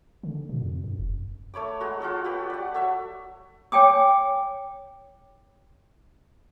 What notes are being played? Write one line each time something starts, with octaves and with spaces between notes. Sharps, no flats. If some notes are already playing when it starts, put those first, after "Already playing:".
D3
B2
F2
F#2
E1
A3 C#5 B5 D6
G#3 F#4 A#5
F4 F#4 A4 C#5
F#4 G4 B4
D5 F#5
F#3 A4 C#5 E5
C#5 G5 G#5 D6 D#6